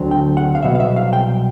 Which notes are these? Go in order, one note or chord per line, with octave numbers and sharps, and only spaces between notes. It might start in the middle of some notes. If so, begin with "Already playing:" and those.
Already playing: D2 D3 F#3 C4
G5
F#5
F5
C2 B2 F#3 B3 E5
F5
E5
F5
G5